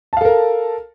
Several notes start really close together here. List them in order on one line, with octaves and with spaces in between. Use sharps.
A5 F5 A4 A#4